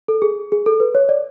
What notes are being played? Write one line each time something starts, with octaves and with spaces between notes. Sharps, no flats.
A4
G#4
G#4
A4
B4
C#5
D5